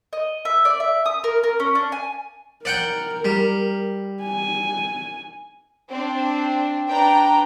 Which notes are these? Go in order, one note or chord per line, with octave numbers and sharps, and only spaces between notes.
D#5
E5
D5
E5
D#6
A#4
A#4
C#4
D4
G#5
A#4 D5 F#5 G5
G3
G#5
C4 D4
D4 B4 G5 A#5